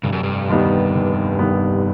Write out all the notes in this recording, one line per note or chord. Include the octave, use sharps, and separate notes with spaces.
F1 G2
F#2
G2
D#2 D#3 G3 B3
F1
D#2 D#3 G3 B3